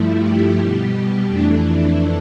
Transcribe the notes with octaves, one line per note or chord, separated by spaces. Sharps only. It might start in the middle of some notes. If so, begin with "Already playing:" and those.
Already playing: G2 F3 A3 E4
G4
B2 G3
F2 E3 A3 D4